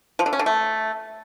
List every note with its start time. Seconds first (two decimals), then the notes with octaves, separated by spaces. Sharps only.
0.19 F3
0.26 D3
0.33 C#4
0.39 D3
0.46 A3